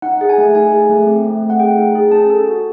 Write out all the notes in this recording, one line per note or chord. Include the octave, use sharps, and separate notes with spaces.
D#4 F#5
G#4
G#5
A3
D#4 G#5
G#4
A3
C4
A3
A3
F#5
G#4 G5
D#4
G#4
C#4 A5
A4
F#4